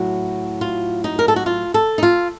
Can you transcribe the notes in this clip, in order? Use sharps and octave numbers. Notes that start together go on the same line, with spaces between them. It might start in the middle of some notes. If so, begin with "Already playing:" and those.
Already playing: A2 F#3 F#4
F4
D#4
A#4
A4
F#4
F4
A4
D#4
F4